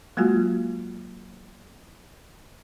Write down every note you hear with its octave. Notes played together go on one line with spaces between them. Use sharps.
F#3 G#3 A#3 F4 F#4